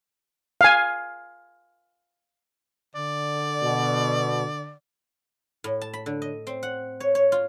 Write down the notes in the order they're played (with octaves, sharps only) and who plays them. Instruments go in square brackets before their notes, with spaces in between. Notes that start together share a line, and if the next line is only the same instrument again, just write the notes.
[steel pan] F5 G#5
[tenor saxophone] D3 [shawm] D5
[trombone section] B2
[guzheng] A2
A5
B5
D3
D#5
C4
F#5
C#5
C#5
F4